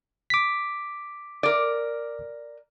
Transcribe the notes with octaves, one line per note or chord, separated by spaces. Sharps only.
D6 B6
A#4 D5